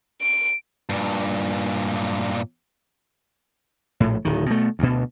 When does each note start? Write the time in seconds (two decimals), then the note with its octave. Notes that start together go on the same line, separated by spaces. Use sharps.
0.22 D7
0.89 G2 A#2
4.00 A#1 A2
4.25 D1 D#3
4.46 B2 A3
4.79 D2 B2